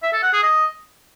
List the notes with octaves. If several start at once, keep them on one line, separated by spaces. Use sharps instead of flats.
E5
A4
F#5
G#4
D#5